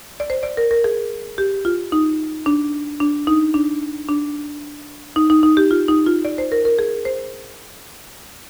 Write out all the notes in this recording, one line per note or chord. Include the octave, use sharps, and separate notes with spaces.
D5
C5
D5
A#4
A#4
G#4
G4
F4
D#4
D4
D4
D#4
D4
D4
D#4
D#4
D#4
G4
F4
D#4
F4
D5
C5
A#4
A#4
G#4
C5